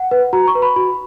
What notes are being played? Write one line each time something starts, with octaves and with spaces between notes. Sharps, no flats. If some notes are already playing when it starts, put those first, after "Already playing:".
Already playing: F#5
B4
F#4 A#5
C#6
B4
B5
F#4 B5